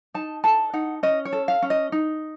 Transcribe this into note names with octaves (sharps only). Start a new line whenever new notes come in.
D#4 A5
A4 A5
D#4 F#5
C#4 D#5
C#5
A4
F5
C#4
D#5
D#4